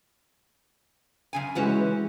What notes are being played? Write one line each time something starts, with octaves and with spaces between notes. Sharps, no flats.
F#2 C#3 G#5
E3 G#3 C#4 F#4 G4